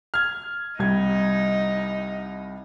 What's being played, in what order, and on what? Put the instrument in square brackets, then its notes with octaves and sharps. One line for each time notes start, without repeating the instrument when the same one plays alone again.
[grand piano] F6 G#6
[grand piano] C2 G3 G#6 [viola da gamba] D#4